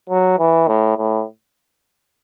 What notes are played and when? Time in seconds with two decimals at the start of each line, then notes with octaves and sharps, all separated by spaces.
0.09 F#3
0.39 E3
0.68 A2
0.97 A2